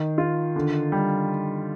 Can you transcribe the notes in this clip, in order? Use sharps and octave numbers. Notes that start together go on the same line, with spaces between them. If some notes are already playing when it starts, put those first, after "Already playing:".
Already playing: D#3
F4
D3
G3